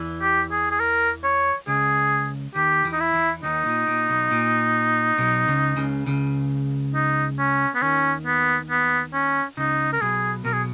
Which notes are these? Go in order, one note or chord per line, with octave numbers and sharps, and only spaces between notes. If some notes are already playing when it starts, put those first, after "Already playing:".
Already playing: E2 E3
G4
G#4
G#4
A#4
C#5
C#2 C#3 G#4
D#2 D#3 G4
E2 E3
D#4
E4
E2 E3
D#2 D#3 D#4
A#2
A#2
B1 B2
A#2
B1 B2
C#2 C#3
C#2 C#3
C#2 C#3
D#4
C#4
B3
D#2 D#3 C#4
B3
B3
C#4
C#2 C#3 D#4
A#4
B1 B2 G#4
B1 B2 A#4
G#4